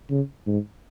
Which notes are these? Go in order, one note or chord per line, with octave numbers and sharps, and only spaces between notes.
C#3
G#2